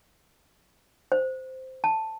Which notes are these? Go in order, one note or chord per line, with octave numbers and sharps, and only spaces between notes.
C5
A5